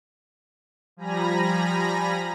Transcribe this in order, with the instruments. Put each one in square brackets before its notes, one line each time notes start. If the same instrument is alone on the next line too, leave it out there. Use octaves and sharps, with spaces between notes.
[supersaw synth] F3 G3 G#5 A#5 B5 A#6